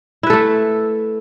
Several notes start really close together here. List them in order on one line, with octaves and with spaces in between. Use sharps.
E4 B4 A4 A3